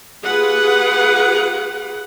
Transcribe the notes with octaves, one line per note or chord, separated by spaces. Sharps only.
F4 G4 G#4 B4 F#5